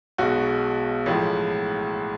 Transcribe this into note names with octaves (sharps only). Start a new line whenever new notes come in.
B1 B2 G#3 F#4
A1 A2 F3 G#3